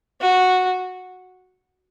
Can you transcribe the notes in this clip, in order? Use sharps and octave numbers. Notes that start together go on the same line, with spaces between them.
F#4